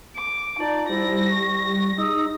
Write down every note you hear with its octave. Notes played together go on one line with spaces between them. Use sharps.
D6
D#4 F4 D5 A5
G3 E4 C5 A#6
C#6
D#4 G#4 D#6 E6